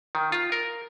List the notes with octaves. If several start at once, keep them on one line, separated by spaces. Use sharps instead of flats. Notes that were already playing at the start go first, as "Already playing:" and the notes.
D#3
F4
A#4